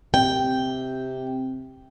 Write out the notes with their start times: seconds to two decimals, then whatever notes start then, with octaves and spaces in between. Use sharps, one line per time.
0.14 C3 G5